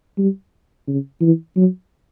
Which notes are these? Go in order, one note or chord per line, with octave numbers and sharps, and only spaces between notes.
G3
C#3
E3
F#3